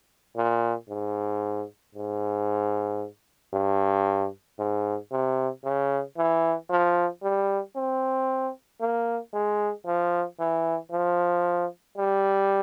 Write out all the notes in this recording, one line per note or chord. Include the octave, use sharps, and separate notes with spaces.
A#2
G#2
G#2
G2
G#2
C3
C#3
E3
F3
G3
C4
A#3
G#3
F3
E3
F3
G3